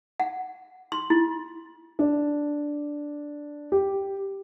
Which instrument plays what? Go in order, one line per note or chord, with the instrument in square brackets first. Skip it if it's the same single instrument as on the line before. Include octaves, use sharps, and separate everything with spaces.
[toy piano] F#5
C6
E4
[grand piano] D4
G4